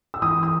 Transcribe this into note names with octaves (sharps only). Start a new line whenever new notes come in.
E6
E3 D#6
D#6